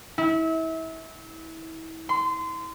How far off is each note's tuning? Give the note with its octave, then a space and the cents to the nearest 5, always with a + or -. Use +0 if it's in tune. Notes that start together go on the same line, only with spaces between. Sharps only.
E4 -30
C6 -25